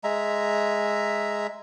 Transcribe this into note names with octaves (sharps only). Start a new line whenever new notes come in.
G#3 E5 A#5